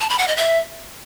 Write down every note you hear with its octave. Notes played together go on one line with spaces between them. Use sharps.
A5
B5
F#5
D#5
E5